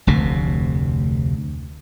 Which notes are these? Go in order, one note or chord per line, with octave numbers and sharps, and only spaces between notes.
F1 D2 C3